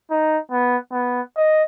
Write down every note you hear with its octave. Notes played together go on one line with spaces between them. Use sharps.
D#4
B3
B3
D#5